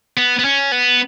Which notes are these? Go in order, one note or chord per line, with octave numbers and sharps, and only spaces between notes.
B3
B3
C#4
B3